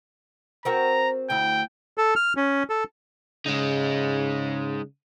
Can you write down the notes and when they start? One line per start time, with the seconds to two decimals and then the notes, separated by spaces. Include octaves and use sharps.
0.65 C4 F#4 A#4 A#5
1.30 D2 E4 G5
1.98 A4
2.16 F6
2.37 C#4
2.70 A4
3.46 C#3 G#3 D#4